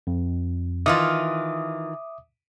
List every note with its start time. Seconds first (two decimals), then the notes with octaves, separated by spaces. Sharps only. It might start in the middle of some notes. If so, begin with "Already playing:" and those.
0.07 F2
0.86 D#3 E3 F4 E5 D6 D#6